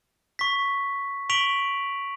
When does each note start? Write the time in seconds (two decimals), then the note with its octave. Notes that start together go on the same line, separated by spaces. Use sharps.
0.39 C#6 B6
1.30 C#6 B6 D7 F7 F#7